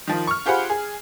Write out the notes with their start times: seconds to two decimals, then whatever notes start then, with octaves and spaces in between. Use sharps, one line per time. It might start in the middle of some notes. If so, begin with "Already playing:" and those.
0.07 D#3 F3
0.27 C#6 F6
0.46 F4 G4 G#4 C5 F#5 B5
0.70 G#4